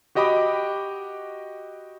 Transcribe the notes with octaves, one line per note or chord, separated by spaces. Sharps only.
F#4 G4 D#5 G5 B5 D6